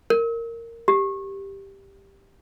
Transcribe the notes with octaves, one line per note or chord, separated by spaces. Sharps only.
A#4
G4